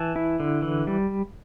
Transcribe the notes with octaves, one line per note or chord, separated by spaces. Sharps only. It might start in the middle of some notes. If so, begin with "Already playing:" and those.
Already playing: E3 A5
E4
D3
E3
G3